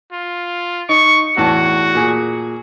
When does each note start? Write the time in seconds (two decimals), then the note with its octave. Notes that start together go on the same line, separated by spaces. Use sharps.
0.12 F4
0.89 D#4 C#6
1.37 E2 A2 F#4 A5
1.95 A#2 G#4